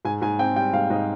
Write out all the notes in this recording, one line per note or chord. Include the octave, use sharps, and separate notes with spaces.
G#2 G#5
G#2 G#5
C4 G5
G3 G5
G#2 F5
G#2 D#5